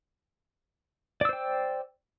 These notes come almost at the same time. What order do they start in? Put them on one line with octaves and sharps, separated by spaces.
D5 E6 C5 G5